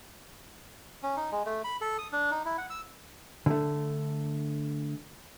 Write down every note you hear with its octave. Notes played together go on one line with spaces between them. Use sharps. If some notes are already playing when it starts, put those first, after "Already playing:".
C#4
D#4
G#3
A3
B5
A4
D#6
D4
D#4
E4
F#5
E6
D3 A3